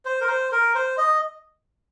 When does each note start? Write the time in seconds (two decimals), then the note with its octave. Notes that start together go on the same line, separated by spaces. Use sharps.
0.05 C5
0.21 A#4
0.28 C5
0.52 A#4
0.75 C5
0.98 D#5